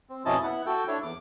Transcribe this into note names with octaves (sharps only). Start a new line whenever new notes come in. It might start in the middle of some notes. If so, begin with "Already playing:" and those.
C4
F2 B2 C#4 E4 D#5 A5
B3 E4 F#5
F#4 A4 G5 G6
D4 E4 A4 C#5
E2 D6